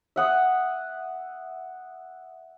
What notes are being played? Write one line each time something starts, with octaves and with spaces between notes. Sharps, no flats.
E5 F#5 D#6